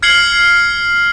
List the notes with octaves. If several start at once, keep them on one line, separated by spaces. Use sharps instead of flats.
F6 G#6 C7 C#7 F#7 G7